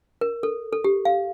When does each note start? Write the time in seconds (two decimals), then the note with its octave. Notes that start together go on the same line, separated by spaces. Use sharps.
0.21 A#4
0.43 A4
0.73 A4
0.84 G4
1.05 F5